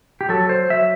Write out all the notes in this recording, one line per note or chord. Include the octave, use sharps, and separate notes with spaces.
G4
F#3 A4
C5
F#3 E5